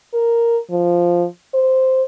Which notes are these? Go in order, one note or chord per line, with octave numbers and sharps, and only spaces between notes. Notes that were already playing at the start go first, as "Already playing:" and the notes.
A#4
F3
C5